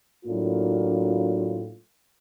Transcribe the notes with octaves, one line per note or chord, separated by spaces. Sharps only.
A2 F#3 A#3 D4 F4